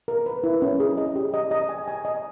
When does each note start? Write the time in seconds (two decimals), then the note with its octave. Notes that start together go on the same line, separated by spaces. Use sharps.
0.08 A#4
0.26 B4
0.44 E4
0.62 C#4
0.80 G#4
0.98 D#5
1.16 G4
1.34 D#5
1.51 D#5
1.69 G#5
1.88 G#5
2.05 D#5